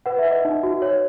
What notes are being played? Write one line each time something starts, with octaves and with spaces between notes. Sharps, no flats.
B4 F#5
E5
B4
D#5
D#4
F#4
C#5